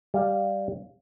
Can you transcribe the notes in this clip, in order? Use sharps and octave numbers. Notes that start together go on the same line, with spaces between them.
G3 F5